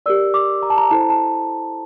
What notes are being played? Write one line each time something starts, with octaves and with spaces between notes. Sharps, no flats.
G4 A#4 D5 E6
D6
A#5
A5
A#5
E4 A4 C5 A5
A#5
A5